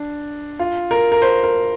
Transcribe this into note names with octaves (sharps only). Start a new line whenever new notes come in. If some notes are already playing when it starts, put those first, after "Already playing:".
Already playing: D4
F4
A#4
A#4
C5
A#4